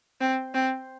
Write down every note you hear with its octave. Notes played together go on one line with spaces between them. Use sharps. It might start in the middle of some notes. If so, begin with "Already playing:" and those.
C4
C4